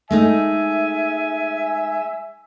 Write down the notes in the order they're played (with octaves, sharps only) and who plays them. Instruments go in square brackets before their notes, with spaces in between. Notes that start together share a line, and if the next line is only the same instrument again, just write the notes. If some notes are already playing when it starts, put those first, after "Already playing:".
[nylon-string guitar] G#3 A3 D#4 [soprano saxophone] E5 [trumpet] G#5